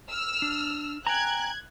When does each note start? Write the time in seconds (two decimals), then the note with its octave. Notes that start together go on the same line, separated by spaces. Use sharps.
0.11 E6 F6
0.42 D4
1.07 G5 G#5 A#5 F#6 G#6